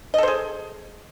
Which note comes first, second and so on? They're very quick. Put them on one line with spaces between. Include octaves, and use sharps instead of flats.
D#5 A4 C5 G#4